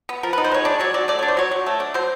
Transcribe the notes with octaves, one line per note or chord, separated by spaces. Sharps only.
B3
F3 A#4
D#4 B4
C5
G#3 C#5
D4 D5
F#3 C#5
F#3 D5
A3 D5
D4 C#5
C5
F#3 C#5
F#3
A3
D4
F#3 C5